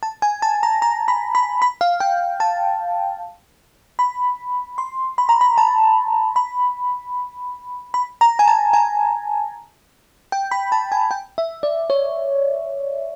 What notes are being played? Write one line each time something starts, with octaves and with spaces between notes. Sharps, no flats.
A5
G#5
A5
A#5
A#5
B5
B5
B5
F5
G5
A5
B5
C6
B5
A#5
B5
A5
B5
B5
A#5
G#5
A5
G#5
G5
B5
A5
G#5
G5
E5
D5
C#5